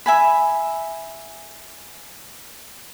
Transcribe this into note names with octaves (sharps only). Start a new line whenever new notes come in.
E5 G#5 B5